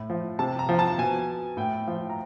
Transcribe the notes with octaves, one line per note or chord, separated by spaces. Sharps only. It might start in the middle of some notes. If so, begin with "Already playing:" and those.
Already playing: A2
F3
C3 A5
A#5
F3
A5
B2 G#5
A2 G5
F3
A#5